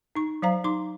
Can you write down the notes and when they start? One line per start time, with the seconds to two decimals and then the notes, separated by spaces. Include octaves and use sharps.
0.16 D#4 C#6
0.42 F#3 C5 F5 A#5
0.64 D#4 C6 D6